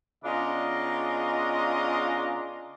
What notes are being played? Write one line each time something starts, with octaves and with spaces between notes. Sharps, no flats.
C#3 B3 D4 F4 D#5 A#5